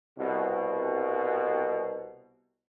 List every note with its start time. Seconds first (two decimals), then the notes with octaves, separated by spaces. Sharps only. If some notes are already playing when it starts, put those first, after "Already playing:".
0.18 C2 B2